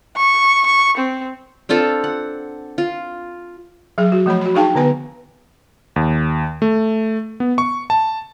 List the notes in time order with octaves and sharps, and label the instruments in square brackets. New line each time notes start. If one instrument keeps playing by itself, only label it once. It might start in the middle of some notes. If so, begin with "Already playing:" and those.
[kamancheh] C#6
C#6
C4
[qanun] C4 D4 F4 A4
F#5
F4
[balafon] F#3 G#4
F#4
F3 A3 C#5 B5
F#4 B5
D4 D#4 G#4 F5 G5 A5
D3 B3 B4 G#5
[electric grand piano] D#2
A3
B3
C#6
A5